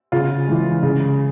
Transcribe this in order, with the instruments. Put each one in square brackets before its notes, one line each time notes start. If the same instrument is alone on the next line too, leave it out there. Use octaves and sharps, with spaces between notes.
[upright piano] C#3 F4
E3 G#3
C#3